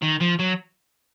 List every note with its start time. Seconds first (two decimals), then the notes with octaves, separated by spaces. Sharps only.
0.03 D#3
0.21 F3
0.40 F#3